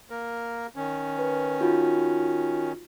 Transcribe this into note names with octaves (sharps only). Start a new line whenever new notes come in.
A#3 A#4
D#3 C#4
B4
D#4 F4 F#4